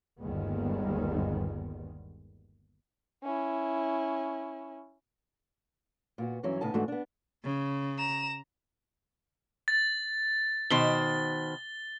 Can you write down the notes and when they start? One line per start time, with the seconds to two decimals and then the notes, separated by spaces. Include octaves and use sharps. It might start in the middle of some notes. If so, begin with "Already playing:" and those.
0.20 G1 D#2 D#3 G3 G#3 B3
3.23 C#4 E4
6.18 A#2 B3 F#4
6.43 G2 E3 F#3 C#4
6.61 A2 C#3 B3 D#4 G#5 A5
6.74 G#2 E3 A3 D4 F#4
6.88 B3 D4
7.44 C#3
7.98 A#5 E7
9.68 A6
10.70 B2 D#3 C5 G7